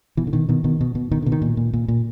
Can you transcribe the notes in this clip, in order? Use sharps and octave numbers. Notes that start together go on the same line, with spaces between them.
B2 E3
D3
B2 D#3
B2 D#3
B2 D#3
B2
B2
B2 D#3
B2 D3
D#3
A#2
A#2
A#2
A#2